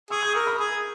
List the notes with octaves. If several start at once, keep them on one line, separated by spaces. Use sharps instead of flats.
G#4 C#6 E6
D#6 G6
A#4 C#6 E6
B5 D#6
G#4